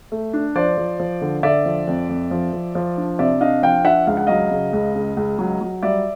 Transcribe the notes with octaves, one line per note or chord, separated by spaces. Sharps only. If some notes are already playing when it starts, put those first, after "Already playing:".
A3
D4
F3 C5 D5
F3
F3
D3
D3 D5 E5
F3
F2
F2
F3
F3
F3
D4
C3 D5 E5
D4 D#5 F5
F3 F5 G5
D4 E5 F#5
C#2 F5
F#5
F#3 D#5 F5
C#3
C#2
C#3
C#2
F#3
F#3
G3 D5 E5